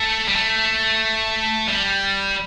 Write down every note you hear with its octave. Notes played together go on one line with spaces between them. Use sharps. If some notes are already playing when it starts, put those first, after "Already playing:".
Already playing: A3
G3
A3
G3